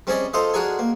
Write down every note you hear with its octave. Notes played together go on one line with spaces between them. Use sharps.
G3 C4 C#4 G#4 D5 D#5
F4 A4 C5 D#5 F5
D4 F#4 G#4 A#4 G#5
A#3